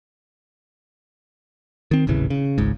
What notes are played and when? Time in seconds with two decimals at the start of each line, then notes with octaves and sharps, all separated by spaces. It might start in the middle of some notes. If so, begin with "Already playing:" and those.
1.91 D#3 C4
2.07 D#1 A1 C#3 E3
2.30 C#3
2.58 G#1 C#2 G#2